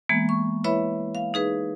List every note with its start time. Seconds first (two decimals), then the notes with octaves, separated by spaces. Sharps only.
0.09 E3 G#3 A#3 B3
0.29 C#6
0.64 E4 B4 C#5 E5 B5
1.15 F5
1.34 D#4 G#4 B4